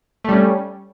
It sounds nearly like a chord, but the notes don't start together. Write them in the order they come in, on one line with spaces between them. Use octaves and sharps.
A3 G3 C#4